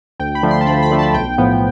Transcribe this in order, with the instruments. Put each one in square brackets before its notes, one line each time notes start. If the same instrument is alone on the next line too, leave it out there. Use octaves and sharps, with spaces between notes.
[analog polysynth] D2 G5
B5
D3 F3 A3
C6
A5
D2 B5
B5
D3 F3 A3
A5
B1 G5
A2 F3 B3